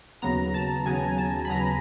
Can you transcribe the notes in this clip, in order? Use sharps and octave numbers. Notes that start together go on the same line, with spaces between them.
D#2 C#3 F#3 B3 A#5
A5
D#2 C#3 F#3 B3 G#5
A5
B5
D#2 C#3 F#3 B3 A#5